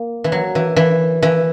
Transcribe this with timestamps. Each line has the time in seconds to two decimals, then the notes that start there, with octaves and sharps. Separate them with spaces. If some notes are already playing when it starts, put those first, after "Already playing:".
Already playing: A#3
0.24 E3
0.32 F#3
0.55 E3
0.76 E3
1.22 E3